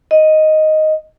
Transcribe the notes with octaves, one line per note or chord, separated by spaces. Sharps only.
D#5